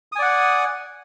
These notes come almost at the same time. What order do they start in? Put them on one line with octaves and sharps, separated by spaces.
D#6 G#5 D5 F#5